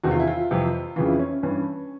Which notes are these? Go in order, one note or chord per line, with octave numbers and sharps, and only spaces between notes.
E2 C3 D#3 F#4
F4
E4
F4
F2 C3 E3
F2 C#3 E3 F4
E4
C#4
G2 E3 C#4